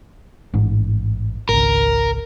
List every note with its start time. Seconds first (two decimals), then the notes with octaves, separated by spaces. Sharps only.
0.54 A1 G#2
1.49 G#1 C#2 A#4